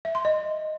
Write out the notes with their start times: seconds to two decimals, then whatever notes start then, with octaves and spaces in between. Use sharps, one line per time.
0.05 E5
0.15 C6
0.25 D#5